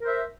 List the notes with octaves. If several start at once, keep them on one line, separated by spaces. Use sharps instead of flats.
A#4 C5 E5